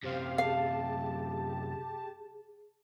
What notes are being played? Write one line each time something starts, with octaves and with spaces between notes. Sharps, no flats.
F#2 C3 G4 C5 F5
G4 G#4 F5 A5